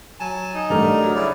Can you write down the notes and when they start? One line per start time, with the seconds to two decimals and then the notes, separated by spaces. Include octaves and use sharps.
0.20 F#3 G#5 A5
0.55 D#4
0.70 D3 G3 A3 A#4 D5 A#5
1.01 F#3
1.15 C#3 E4 D5